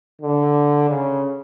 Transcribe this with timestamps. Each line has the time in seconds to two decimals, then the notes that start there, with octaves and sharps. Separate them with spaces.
0.22 D3
0.89 C#3